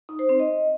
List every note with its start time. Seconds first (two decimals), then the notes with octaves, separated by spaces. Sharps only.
0.09 D#4
0.19 C5
0.29 C4
0.39 D#5